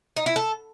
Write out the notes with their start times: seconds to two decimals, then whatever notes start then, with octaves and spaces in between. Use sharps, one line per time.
0.16 D#4
0.26 E4
0.36 A4